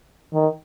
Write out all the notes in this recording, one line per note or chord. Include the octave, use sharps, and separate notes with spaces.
D#3